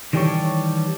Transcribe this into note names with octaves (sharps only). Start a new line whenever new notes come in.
D#3 E3 G3 G4 A4 C#5